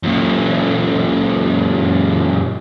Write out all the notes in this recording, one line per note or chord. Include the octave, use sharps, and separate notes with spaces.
F#2 A#2